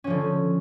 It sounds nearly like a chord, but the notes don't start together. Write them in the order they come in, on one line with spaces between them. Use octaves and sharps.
C#4 F3 D3